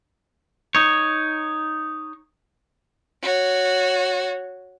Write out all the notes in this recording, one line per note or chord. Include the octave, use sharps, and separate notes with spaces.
D#4 C#5
F#4 C#5